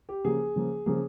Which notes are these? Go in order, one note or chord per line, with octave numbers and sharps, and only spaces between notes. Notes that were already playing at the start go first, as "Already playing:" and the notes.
G4
C#3 F3 A#3 G#4
C#3 F3 A#3
C#3 F3 A#3 G#4